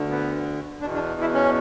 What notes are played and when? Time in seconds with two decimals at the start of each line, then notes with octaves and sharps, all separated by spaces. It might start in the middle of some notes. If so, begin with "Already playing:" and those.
Already playing: D2 D3
0.11 B3
0.81 E2 B2 D4
0.94 D4
1.21 E4
1.34 C#4